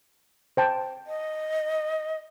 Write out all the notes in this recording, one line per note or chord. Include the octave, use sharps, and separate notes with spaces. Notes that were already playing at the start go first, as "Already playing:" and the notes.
C5 G5 A5
D#5